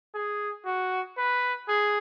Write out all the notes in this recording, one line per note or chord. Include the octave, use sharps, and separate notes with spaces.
G#4
F#4
B4
G#4